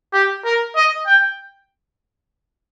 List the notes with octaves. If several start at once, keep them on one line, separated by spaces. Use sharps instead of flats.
G4
A#4
D#5
G5